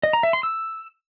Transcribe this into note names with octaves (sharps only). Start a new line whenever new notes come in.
D#5
A#5
E5
C6
E6